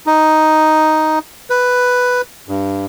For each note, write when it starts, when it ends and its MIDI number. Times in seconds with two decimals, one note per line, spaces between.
0.07 1.19 63
1.50 2.22 71
2.48 2.86 43